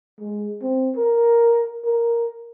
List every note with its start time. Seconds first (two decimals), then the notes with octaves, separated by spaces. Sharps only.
0.21 G#3
0.62 C4
0.96 A#4
1.85 A#4